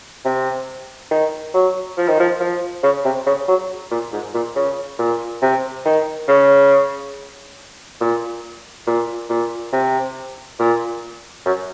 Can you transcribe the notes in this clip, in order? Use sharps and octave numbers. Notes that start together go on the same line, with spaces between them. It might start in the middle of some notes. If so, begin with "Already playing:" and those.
C3
D#3
F#3
F3
D#3
F3
F3
C#3
C3
C#3
F#3
A#2
G#2
A#2
C#3
A#2
C3
D#3
C#3
A#2
A#2
A#2
C3
A#2
F#2